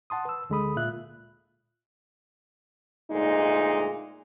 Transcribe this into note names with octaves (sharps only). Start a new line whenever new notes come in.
F#5 A5 C6 D#6
B4 E6
D2 D3 G#3 A4 B5 D#6
A#2 F4 E5 F#6
D2 A#2 G#3 D#4